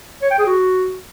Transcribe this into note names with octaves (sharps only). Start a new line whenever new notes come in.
C#5
G5
G#4
F#4